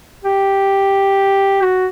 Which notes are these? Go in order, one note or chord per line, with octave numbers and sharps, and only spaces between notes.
G4
F#4